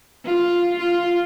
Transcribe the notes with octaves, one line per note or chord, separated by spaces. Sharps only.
F4
F4